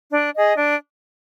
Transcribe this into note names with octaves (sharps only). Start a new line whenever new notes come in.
D4
G#4 D#5
D4